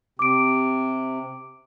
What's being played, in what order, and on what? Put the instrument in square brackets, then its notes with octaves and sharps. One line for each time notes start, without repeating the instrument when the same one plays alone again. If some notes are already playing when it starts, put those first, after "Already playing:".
[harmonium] C3 [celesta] D6 D7